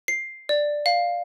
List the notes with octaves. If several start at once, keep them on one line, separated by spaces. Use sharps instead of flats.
C7
D5
F5